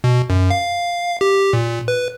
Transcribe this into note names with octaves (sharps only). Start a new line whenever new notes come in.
B2
F#2
F5
G4
A#2
B4